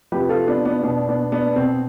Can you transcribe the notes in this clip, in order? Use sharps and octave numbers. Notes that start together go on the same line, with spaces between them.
C3 F3 G4 B4
F4 A4
B3 D4
B3 D4
B2 B3 D4
B3 D4
B3 D4
B2 C4